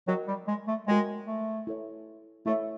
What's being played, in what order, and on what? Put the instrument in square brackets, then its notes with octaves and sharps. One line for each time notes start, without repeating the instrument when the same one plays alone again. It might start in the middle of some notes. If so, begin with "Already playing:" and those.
[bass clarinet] F#3 [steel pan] F#4 A#4 D#5 G5
[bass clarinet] G3
G#3
A3
[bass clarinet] G#3 [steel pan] F#4 A#4 D#5 G5
[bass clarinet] A3
[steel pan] E4 A4 C#5 E5
[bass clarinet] A3 [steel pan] E4 A4 C#5 E5